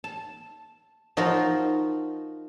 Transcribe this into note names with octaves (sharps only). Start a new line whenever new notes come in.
A5
F3 D#4 F4 F#4 A#4 A#5